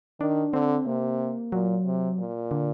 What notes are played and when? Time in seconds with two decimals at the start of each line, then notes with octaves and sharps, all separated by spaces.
0.20 D#3 D4
0.53 D3 C4
0.86 C3 A#3
1.52 A#2 F#3
1.86 C3
2.19 A#2
2.51 D3